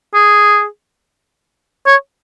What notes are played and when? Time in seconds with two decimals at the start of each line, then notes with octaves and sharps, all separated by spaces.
0.14 G#4
1.87 C#5